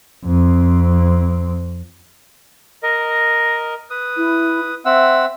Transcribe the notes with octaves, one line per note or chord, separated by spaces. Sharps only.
F2 C4
A#4 D#5
B4 D#6
E4
C4 E5 F#5 E6